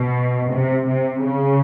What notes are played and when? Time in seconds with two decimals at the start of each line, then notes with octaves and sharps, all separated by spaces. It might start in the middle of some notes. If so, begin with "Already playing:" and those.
Already playing: B2
0.51 C3
0.88 C3
1.25 C#3